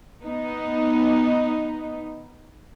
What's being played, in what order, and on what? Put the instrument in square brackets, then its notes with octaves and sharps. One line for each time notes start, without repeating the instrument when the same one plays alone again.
[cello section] B3 D#4